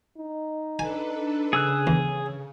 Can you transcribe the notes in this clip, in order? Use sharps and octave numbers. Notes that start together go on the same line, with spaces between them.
D#4
D4 A4 B4 G#5
C#3 G#4 E6 F#6
E2